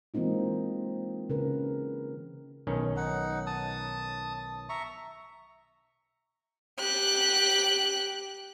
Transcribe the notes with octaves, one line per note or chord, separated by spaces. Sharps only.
E3 G#3 A#3 C4 D#4 F4
C#3 A#4 B4
B1 D#3 C#4
D#4 F#5
A5 D#6
E5 A#5 C#6
G4 F#6